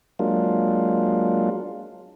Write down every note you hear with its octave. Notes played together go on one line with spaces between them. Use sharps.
F#3 G#3 A#3 D4 F4